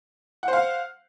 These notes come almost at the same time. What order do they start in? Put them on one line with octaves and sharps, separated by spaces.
F#5 C5 F5